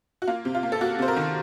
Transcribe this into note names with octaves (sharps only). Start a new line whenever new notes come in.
F#4
A#3 F4
C3
F4
A#3
A4
A#3 F#4
C3 C5
A#4
D#3